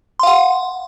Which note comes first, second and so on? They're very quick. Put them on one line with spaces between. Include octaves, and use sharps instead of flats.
C6 F5 F#5